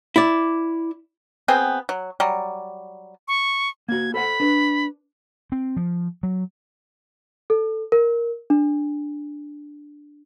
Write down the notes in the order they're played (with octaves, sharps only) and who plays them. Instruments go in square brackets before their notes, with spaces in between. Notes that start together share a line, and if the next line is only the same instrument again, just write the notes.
[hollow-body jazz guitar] E4 D5
[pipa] B3 C4 G#4 G5
F#3
F#3 G3
[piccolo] C#6
[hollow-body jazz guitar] A#3 F#4 [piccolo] G#6
[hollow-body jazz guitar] A4 C5 F#5 [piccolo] B5
[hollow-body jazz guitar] D4 B4
[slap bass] C4
F3
F#3
[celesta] A4
A#4
D4